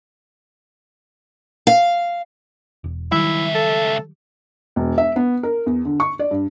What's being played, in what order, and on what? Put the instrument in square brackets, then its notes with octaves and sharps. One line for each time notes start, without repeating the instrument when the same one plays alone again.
[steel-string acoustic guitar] F5
[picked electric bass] E1
[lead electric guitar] C#2 E5 [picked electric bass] D#3 F#3 G3 [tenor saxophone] E4
[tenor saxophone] A4
[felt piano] E1
E5
B3
A#4
E2
D3
C#6
D5
G2